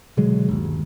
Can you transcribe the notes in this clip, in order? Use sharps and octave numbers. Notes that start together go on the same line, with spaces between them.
B2 D3 F#3 G#3
G1 D#2